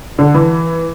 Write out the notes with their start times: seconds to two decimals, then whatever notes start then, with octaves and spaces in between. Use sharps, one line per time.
0.19 D3
0.34 E3